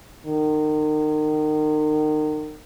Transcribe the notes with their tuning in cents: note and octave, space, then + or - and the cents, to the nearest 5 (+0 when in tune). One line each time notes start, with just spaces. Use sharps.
D#3 -30